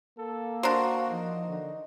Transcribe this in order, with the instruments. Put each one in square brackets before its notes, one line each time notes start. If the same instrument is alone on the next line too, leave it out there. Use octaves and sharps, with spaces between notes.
[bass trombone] A#3 [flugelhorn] A4
[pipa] D4 A#4 C5 [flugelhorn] F#4 [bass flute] F5
[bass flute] F3 [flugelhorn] D#4
[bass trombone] D3